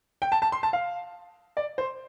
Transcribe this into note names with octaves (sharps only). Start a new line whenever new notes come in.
G5
A5
A5
C6
A5
F5
D5
C5